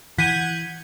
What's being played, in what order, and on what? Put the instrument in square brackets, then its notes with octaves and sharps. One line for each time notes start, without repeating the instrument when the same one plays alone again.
[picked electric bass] E3 [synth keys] F#5 G6 G#6 [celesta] B6 D#7